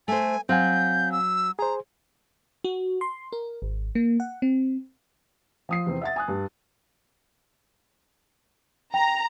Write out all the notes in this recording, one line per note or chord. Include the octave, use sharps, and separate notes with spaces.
A3 C5 G#5
F#3 C4 F5 G#5 G6
E6
G#4 C5 A#5
F#4
C6
A#4
G#1
A#3
F#5
C4
F3 D#6 C7
E2 C3 C4
E5 F#5 A6
G#5 D#6 F#6
G2
G5 A#5